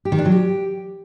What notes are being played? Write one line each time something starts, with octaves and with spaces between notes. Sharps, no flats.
G4
D#3
D4
F#3
G4